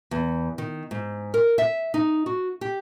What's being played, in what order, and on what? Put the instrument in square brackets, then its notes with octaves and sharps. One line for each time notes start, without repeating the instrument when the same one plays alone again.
[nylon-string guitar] E2
D#3
G#2
A#4
E5
D#4
F#4
G4